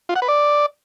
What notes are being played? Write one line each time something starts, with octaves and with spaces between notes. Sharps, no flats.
F4
F#5
B4
D5